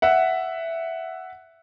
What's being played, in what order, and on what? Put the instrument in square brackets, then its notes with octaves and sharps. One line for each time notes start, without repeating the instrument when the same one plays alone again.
[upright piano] E5 F#5